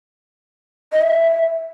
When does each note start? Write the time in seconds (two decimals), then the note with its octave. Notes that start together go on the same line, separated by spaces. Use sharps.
0.92 D#5
1.01 E5